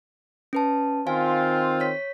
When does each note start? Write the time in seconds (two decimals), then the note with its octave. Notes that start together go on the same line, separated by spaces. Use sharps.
0.53 C#4 B4 A5
1.07 D#3 C4 F4 F5 G#5
1.80 C#5 B6